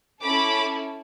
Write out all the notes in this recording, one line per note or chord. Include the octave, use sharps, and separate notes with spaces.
C#4 E4 A4 B5 D6